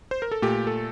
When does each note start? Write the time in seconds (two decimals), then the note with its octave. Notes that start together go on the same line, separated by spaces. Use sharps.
0.11 C5
0.22 A#4
0.31 A4
0.42 A#2 A3 G4
0.67 A4